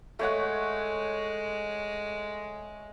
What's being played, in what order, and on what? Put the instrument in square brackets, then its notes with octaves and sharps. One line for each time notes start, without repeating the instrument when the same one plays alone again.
[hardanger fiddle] G#3 [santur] A3 C#5 F#5